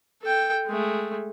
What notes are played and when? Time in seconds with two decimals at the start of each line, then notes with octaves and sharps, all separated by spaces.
0.23 A4 G5
0.67 G#3 A3